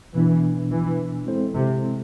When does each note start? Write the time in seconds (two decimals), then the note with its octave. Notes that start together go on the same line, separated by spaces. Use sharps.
0.14 B2 E3 B3 D4
0.71 E3
1.27 G#3 C4 E4 A4 C5
1.54 C3